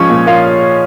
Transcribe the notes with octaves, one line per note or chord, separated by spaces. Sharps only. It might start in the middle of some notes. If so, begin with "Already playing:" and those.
Already playing: F3 G#3 C#4 C#5
A#2
A#3 F4 F5